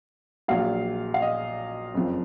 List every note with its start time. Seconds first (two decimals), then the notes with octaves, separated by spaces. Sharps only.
0.48 A#1 A#2 F#3 F5
1.14 F5
1.22 D#5
1.94 F#1 F2 F3